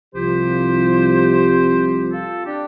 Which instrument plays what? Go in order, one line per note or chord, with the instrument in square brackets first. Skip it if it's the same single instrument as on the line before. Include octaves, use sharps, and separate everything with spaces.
[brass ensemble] C2 C3 F3 [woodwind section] G4 C5
[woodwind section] F4 A4
D4 G4